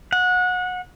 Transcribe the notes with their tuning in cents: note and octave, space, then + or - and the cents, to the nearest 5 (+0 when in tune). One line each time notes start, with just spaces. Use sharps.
F#5 -25